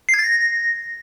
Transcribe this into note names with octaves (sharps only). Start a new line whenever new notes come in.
C7
G#6
A6
A#6